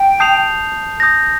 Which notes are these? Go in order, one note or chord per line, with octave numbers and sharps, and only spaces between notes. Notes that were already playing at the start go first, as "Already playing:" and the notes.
Already playing: G5
A5 D#6 G6 C7 F7
D#6 G6 A#6